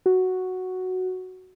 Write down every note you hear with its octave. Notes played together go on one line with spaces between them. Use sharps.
F#4